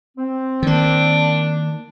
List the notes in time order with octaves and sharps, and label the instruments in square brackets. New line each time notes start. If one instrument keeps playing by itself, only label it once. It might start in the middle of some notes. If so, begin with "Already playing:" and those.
[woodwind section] C4
[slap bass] D#3 A#3 [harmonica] D4